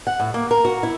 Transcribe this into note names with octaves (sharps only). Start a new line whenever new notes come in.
F#5
A2
A#3
A#4
F#4
E4